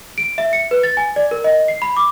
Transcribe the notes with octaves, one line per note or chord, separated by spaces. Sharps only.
D7
E5
C#7
B4
A6
G#5
D5
A#4
D#5
C7
B5
D6